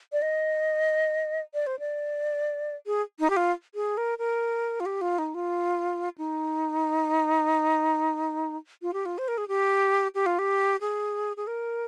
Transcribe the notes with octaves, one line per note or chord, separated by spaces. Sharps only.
D5
D#5
D5
C5
D5
G#4
D#4
G4
F4
G#4
A#4
A#4
F4
G4
F4
D#4
F4
D#4
F4
G4
F4
C5
A#4
G#4
G4
G4
F4
G4
G#4
G#4
A#4